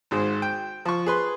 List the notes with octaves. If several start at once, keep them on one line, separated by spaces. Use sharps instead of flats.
G#1 G#2 G#3 C5
G5
F3 C#6
G#4 B4 C6